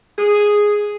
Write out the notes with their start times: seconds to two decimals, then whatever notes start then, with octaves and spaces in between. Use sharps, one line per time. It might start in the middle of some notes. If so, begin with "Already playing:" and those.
0.17 G#4